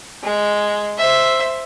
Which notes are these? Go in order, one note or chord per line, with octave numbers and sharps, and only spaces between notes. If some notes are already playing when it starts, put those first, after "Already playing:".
G#3
C5 E5